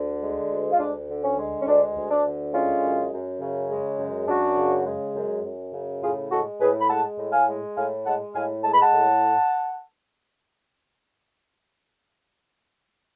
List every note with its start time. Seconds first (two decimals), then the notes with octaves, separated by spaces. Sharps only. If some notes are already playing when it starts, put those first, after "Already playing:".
Already playing: D2 D3
0.22 G#3
0.50 D2
0.72 F4
0.79 D2 D4
1.09 D3
1.24 C#4
1.37 G#3
1.62 C#4
1.67 D2 D4
1.96 D2
2.11 D4
2.25 D3
2.54 G#3 C#4 F4
2.82 F#2
3.13 F#2
3.40 C#3
3.71 G#3
3.99 F#2
4.28 F#2 D4 F#4
4.57 C#3
4.86 G#3
5.16 F#2
5.44 F#2
5.73 C#3
6.03 A2 F4 G#4
6.31 G#3 F#4 A4
6.60 A2 G#4 B4
6.81 B5
6.89 G#3 F#5 A5
7.18 A2
7.32 F5 G#5
7.48 G#3
7.77 A2 F5 G#5
8.05 G#3 F#5 A5
8.35 A2 F5 G#5
8.63 G#3 A5
8.73 B5
8.82 F#5 A5
8.92 A2